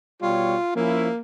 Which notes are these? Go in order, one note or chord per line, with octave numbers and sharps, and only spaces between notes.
B2 G3 F4 C#5
F3 A#3 C#4 E4